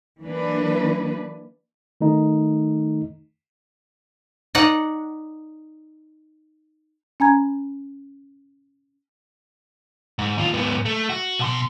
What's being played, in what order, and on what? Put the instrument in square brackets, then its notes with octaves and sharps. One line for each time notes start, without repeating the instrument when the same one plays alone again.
[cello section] E3 F#3 A#3 D4 B4
[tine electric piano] D#3 A3 D#4
[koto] D#4 D5 F#5
[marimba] C#4 G#5 A#5 G#6
[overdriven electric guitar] G#2
D#2 F4
G#2 B3
A3
F#4
B2 C6